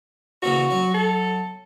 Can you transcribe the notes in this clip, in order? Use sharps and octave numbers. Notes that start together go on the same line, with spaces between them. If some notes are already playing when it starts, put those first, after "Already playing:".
A#2 C#3 E3 F#4
F#3
A4